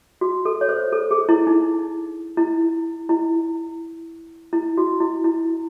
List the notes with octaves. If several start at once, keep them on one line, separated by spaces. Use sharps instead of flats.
F#4
A4
C#5
C5
A4
G#4
E4
D#4
E4
E4
E4
F#4
E4
E4